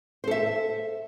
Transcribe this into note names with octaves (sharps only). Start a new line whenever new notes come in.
A4 C5 E5